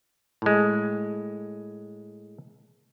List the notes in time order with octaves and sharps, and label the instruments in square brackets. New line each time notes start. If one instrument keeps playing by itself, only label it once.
[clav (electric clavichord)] A2 G#3